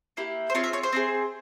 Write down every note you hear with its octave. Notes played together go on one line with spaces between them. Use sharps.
A#3 E4 G4
C5
C4 F4 G#4 C#5
E5
C#5
C5
C4 E4 G#4